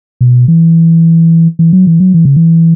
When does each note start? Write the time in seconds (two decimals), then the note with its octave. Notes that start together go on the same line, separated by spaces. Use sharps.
0.21 B2
0.48 E3
1.59 E3
1.73 F#3
1.87 E3
2.00 F#3
2.14 E3
2.25 C#3
2.36 E3